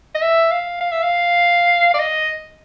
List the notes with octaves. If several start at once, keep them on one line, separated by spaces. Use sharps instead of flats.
D#5
E5
F5
F5
E5
F5
D5
D#5